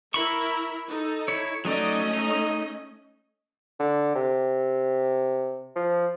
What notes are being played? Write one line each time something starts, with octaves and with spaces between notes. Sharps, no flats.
E4 A#4 E5 B5 C#6
D#4 A4
E4 C#5
F#3 A3 C#4 D#4 D5 D#5
D#4
D3
C3
F3